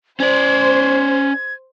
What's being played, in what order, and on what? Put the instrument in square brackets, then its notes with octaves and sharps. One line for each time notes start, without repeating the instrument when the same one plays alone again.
[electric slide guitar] C#4 D5 [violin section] C5 [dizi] G#6